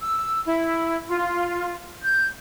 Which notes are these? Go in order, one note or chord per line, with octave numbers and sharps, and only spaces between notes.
E6
E4
F4
G6